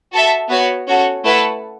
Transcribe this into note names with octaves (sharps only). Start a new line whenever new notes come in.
F#4 A4 E5
B3 F#4 C#5
C#4 F#4 A4
A3 E4 B4 F#5 A5